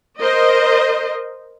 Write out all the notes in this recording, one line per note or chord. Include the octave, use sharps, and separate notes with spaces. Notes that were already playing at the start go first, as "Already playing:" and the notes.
A#4 C5 D#5